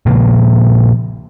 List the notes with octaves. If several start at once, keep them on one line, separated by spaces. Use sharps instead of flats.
A#2 C#3 F3 A#3